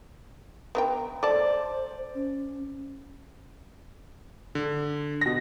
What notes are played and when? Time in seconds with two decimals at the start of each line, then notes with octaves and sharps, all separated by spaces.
0.75 B3 A#4 G5
1.23 A4 C5 D5 A5
2.15 C#4
4.55 D3
5.21 B2 A#6